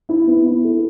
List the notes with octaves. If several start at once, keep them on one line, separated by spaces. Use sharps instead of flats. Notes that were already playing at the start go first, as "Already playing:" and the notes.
E4
B3
E4
A4